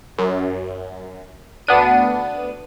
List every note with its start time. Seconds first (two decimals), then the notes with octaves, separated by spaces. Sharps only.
0.18 F#2
1.67 D2 B3 D4 D#7